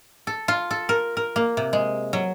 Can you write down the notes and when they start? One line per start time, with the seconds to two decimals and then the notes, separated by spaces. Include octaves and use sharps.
0.27 A4
0.48 F4
0.71 A4
0.89 A#4
1.17 A#4
1.36 A#3
1.57 C3
1.73 G#3
2.13 F#3